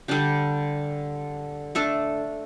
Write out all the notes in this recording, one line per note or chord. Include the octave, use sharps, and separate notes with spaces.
D3 G3 D4 G4
A3 D4 A4